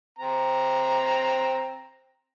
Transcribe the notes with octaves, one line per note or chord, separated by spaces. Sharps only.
C4 A#5